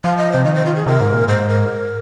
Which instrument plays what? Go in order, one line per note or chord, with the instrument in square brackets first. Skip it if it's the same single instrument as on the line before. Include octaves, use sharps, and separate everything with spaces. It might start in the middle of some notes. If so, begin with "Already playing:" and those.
[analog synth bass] F3 [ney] F5
[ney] D#5
[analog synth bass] C3 [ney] C5
[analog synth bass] D#3 [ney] D#5
[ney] C5
F4
G#4
[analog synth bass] C3 [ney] A#4
[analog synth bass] G#2
A#2
[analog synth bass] G#2 [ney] C5
[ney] A#4